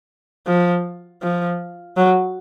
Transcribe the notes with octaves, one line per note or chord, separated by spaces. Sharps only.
F3
F3
F#3